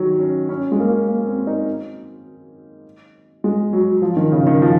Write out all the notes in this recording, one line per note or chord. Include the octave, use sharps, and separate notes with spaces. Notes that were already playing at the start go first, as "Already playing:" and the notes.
Already playing: D#3 F#3
C#4
C#4
G#3
A#3
A#3
C4
D#4
G#3
F#3
F3
D#3
C#3
D#3
F3